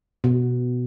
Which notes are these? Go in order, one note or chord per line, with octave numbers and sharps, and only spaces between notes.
B2